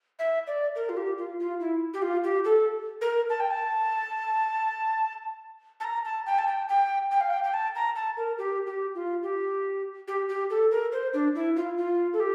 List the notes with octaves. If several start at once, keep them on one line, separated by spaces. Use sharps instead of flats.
E5
D5
A#4
F4
G4
F4
F4
E4
G4
F4
G4
A4
A#4
A5
G5
A5
A5
A#5
A5
G5
A5
G5
G5
G5
F5
G5
G5
A5
A#5
A5
A#4
G4
G4
F4
G4
G4
G4
A4
A#4
C5
D4
E4
F4
F4
A4
G4